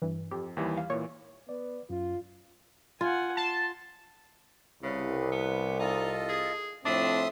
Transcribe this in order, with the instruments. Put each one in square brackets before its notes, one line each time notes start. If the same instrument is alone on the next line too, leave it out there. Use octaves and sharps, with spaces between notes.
[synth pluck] G2 E3
[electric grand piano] F2 [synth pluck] G4
[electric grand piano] D#2 E3 G3
[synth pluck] F5
[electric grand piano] A#2 E3 [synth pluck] C#5
[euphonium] B3 [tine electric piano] D5
[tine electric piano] F#2 [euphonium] F4
[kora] F4 [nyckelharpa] F#5 G#5
[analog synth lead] A5 [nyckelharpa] C6
[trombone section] C2 [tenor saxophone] C#3 [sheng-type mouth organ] B4
[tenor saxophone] B3
[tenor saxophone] D#4 [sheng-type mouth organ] F4 A4 D#5
[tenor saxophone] G#4
[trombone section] F2 A2 C4 [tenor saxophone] D4 [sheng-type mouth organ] E5 C6 D#6